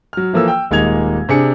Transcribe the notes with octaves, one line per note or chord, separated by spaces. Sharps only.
F#3 F6
E3 F3 A#3 A4 E6
G5 E6
D#1 G#3 A#3 D#4 G#6 F7
C3 D4 G#4 C#7